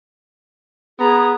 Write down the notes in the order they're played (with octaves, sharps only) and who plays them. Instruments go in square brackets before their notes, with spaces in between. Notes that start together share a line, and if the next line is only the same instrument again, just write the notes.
[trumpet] B3 [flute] G#4 [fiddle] A#5